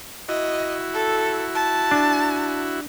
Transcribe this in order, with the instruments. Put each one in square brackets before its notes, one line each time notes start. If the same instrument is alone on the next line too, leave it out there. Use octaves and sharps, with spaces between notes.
[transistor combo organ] E4 F#4 [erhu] D#5
[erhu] A4
A5
[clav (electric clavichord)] D4